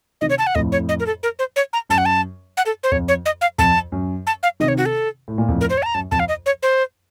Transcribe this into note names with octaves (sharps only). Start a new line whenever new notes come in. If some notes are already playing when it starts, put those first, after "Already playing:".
C3 D#3 D#5
C#5
A5
F#5
F2 A2 D#5
C#5
D#5
A#4
A4
A#4
C5
C#5
A#5
F#2 A5
F#5
A5
F#5
A4
C5
F2 C#5
C#5
D#5
F5
F2 A5
F#2
A5
F5
C3 D#3 D#5
C#5
F#4
A4
A2
A#2
F2 A2
A#4
C5
C#5
A5
A#5
F#2 A5
F2 A5
F5
D#5
C#5
C5